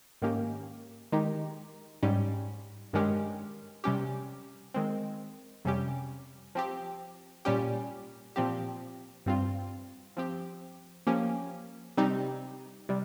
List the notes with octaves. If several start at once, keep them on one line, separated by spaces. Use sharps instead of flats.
G#2 D#3 A#3 C#4 G4
D#3 G#3 D#4 G4
G#2 G3 C#4 G4
G2 D#3 G#3 C#4 G4
C3 G3 C#4 G4
D#3 G#3 C4
F2 C3 G3 C#4 G4
F3 C4 G4
A#2 G3 C#4 G4
A#2 F3 C4 G4
G2 G3 C4 F4
F3 C4 G4
F3 A#3 C#4 G4
C3 G3 C4 D#4 G4
C3 G3